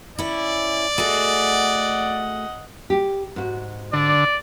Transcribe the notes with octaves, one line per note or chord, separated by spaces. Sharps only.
C#4 E4 D5
A3 F#4 G#4 D#5 F#5
G4
G#2 F#4
D3 D5